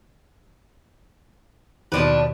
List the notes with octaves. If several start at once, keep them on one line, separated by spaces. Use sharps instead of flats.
D#2 B2 F3 D4 B4